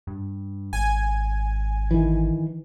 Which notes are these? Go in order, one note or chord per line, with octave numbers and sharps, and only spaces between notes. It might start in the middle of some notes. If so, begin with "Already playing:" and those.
G2
G#1 G#5
D#3 E3